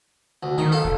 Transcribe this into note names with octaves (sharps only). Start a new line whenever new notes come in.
D2
D#3 D#4
A4 F5
F1